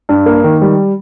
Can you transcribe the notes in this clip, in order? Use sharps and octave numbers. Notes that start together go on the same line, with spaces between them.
G2
A#3
D#3
G3